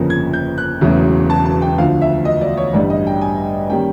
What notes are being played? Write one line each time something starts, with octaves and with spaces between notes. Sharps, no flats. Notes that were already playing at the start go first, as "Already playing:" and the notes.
Already playing: G1 F2 C#3 F3 A#3
G#6
G6
F#6
E1 E2 C#3 F#3 A3
A5
A5
G5
D2 D3 F3 F5
E5
D#5
D5
C#5
A1 G2 D3 G3 D5
D#5
G5
G#5
D#3 G3 A#3 C#4 G5